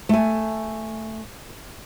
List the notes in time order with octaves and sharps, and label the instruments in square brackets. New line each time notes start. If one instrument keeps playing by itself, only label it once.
[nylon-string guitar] A3 G#5